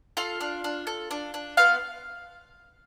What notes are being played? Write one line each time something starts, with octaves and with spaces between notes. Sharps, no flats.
F4 A4 F5
D4
D4
A4
D4
D4
B3 F4 F5